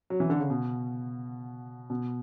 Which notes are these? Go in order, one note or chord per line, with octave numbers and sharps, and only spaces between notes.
F#3
E3
D3
C#3
B2
B2